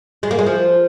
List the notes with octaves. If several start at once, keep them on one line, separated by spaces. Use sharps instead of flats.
G#3
A#3
G#3
F3